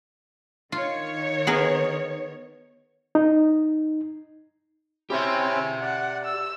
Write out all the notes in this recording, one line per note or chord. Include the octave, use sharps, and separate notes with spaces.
D#3 F4 C#5
B3 G#4 A#4
D#4
C4 C#4 E4 G4 E5
G#5
D5 F#5
E6